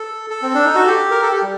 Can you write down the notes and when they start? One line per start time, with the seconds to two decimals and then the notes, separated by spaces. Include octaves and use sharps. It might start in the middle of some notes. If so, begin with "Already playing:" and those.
Already playing: A4
0.30 A4
0.42 C4
0.54 D4
0.65 D#4
0.75 F#4
0.86 G4
1.11 A#4
1.22 A4
1.32 G4
1.42 G3